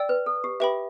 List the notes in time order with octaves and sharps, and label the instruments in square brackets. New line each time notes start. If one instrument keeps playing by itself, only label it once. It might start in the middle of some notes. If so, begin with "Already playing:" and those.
Already playing: [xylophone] D5 G5 E6
[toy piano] B4
A4
G4
[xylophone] G4 B4 G5 B5 [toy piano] E5